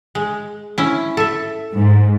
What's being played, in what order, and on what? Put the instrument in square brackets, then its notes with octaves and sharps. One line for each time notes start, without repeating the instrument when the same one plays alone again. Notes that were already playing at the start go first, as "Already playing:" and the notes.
[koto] G#3
C#4 E4
A4 E5
[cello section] G#2